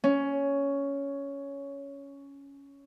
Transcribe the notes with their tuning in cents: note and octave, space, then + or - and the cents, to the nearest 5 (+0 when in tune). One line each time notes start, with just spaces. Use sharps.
C#4 +10